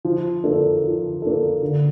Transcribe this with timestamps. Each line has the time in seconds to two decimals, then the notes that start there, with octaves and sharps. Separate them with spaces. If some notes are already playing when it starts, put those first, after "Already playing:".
0.05 F3
0.44 A#3 D4 A4
0.83 F3
1.22 A#3 D4 A4
1.61 D3